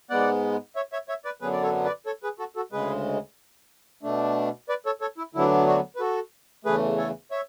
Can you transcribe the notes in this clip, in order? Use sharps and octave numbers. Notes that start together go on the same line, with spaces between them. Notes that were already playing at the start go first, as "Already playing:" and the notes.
G#2 G#3 B3 D5 F#5
C#5 E5
C#5 E5
C#5 E5
B4 D5
F#2 D3 F#3 B3 G#4 B4
D5
A4 C#5
B4 D5
A4 C#5
G#4 B4
F#4 A4
F#4 A4
D2 C#3 G#3 G#4 B4
B2 A3 D4
B4 D5
A4 C#5
A4 C#5
E4
D2 D3 F#3 B3 D4 E4
D4 F#4
B4
F#4 A4
E2 C#3 E3 A3 G#4 B4
A4 C#5
C#5 E5